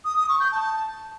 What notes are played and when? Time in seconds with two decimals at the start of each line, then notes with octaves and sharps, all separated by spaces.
0.05 D#6
0.16 D#6
0.28 C#6
0.40 G6
0.52 A5